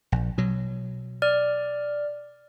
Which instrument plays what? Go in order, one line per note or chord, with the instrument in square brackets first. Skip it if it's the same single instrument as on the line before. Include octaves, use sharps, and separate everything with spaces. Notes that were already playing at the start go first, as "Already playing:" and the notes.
[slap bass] A#1
B2 F#3
[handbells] D5 F6